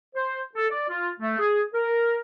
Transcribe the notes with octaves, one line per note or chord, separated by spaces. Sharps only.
C5
A4
D5
F4
A3
G#4
A#4